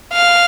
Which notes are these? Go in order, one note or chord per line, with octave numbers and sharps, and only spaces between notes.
F5